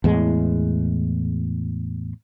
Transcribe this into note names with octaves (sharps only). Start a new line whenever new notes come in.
E2 A2 G#3